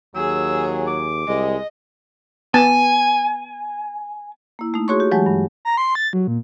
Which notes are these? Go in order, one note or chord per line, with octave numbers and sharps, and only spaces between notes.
D#2 F#3 G#4 E6
D6
C2 G#3 D#5
B3 G#5 A5
A#3 E4
A3 D#4
F#4 G#4 C#5 C6 C#6
G4
E3 F#3 G#3 G4 A5
G2
A#5
C6
A6
F#3
A#2